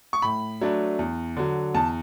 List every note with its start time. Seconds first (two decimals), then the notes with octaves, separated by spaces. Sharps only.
0.13 C#6
0.22 A2 B5
0.61 F#3 A3 D4
0.99 E2
1.37 D3 F#3
1.74 E2 A5